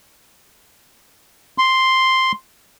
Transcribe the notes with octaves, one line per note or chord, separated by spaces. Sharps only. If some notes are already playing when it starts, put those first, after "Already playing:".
C6